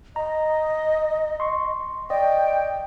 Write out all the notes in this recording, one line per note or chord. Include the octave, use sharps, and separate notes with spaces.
D#5 A#5
C6 C#6
D5 D#5 G5